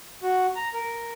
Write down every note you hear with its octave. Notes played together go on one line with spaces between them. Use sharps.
F#4
A#5
A#4